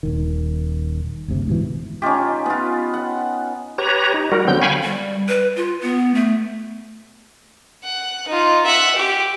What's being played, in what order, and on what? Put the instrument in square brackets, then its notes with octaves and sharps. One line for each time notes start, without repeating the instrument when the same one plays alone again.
[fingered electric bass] D#1 D#3
F#1 D2 C3
G#2 B2 D3 E3
[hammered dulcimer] C#4 D#4 F4 G4
B3 F4
F#5
[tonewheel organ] G4 B4 C#5 A#5
D#4
G3 F#4 A#4
D3 F#3 B3 C4 G6
F5 G5 G#5 B5 C#6
[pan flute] G3
B4
F4
B3
A3
[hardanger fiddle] F#5
D#4 F4
E5 F#5
G4